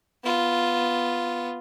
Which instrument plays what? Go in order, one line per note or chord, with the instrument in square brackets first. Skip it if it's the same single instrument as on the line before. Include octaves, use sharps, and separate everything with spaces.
[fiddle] B3 F4